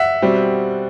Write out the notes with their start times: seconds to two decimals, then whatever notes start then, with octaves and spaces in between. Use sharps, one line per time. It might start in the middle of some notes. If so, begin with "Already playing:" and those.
Already playing: E5 F#5
0.22 B2 G3 C4